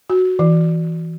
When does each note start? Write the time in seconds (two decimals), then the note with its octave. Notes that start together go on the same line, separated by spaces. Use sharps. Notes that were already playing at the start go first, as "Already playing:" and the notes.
0.10 F#4
0.39 E3